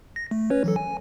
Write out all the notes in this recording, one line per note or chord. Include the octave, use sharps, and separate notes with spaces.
A#6
A3
C#4 B4 C#5
E3 F#3 A4
G#5